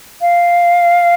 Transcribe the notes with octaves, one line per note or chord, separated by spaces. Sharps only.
F5